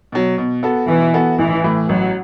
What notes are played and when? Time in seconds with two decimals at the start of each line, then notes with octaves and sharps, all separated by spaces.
0.12 B2 F#3
0.38 B2
0.63 B3 F#4 A4
0.88 B2 E3
1.14 B3 F#4 A4
1.38 A1 E3
1.64 A2 E3
1.89 A1 F#3